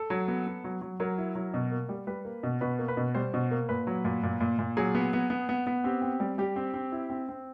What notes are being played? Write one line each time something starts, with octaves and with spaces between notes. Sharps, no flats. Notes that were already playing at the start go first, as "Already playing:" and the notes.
Already playing: A4
F#3
B3
B3
F#3
F#3
F#3 A#4
E4
F#3
B2
A#3
G3
G3 B4
A#3
B2
B2 B4
A#3
B4
B2
G3 C5
B2
A#3
A#2 B4
F#3
A#2
A#2
A#2
A#2
F#3 G#4
B3
B3
B3
B3
B3
C4 G4
C4
G3
G3 G4
C4
C4
E4
C4
C4